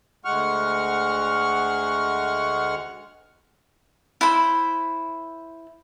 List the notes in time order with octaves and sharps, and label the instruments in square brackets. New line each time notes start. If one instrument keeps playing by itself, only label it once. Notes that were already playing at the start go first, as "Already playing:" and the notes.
[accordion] D2 G#3 F#5 C#6 F6
[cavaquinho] E4 C5 B5